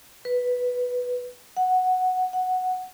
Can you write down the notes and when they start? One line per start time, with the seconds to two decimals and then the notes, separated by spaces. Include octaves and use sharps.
0.25 B4
1.57 F#5
2.33 F#5